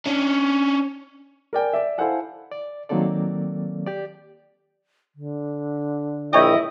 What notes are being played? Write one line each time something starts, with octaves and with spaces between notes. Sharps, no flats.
C#4 D4
A#4 D5 G5 G#5
D5 E5
E4 A4 C5 F5 F#5 G#5
D5
D#3 F#3 A#3 C4 A4 D5
G4 D5
D3
A#1 E4 C#5 D#5 G5